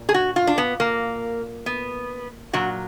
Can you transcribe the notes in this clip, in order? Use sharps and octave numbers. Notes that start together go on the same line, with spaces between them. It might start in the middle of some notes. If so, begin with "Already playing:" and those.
Already playing: A#2
G#4
F#4
F4
D4
B3
A#3
B3
A#2 F#3 F#4